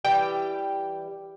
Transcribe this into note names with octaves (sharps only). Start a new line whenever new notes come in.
E3 G3 G4 G5